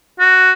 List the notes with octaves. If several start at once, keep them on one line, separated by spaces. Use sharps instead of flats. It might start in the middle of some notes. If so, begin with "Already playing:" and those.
F#4